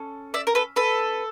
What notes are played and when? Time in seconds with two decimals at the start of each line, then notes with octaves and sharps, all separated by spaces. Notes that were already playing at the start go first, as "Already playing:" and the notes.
Already playing: C#4 A4
0.34 D5 E5
0.47 A#4
0.55 A4 B4
0.76 A4 B4